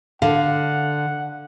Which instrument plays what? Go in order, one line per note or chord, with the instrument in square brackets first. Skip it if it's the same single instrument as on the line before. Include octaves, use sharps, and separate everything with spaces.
[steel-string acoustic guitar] D3 [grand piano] F5 [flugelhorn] F#5